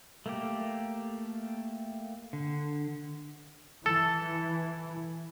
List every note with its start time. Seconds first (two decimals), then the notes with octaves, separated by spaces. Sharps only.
0.26 A3 A#3 G4
2.33 D3
3.86 E3 A4